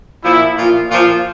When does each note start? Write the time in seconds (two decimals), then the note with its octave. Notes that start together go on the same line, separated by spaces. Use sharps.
0.24 A#2 F3 E4
0.57 A#2 F3 F4
0.91 A#2 F3 F4